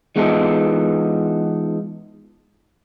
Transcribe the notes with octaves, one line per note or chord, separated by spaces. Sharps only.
E3 G#3 B3 D#4 F4 A4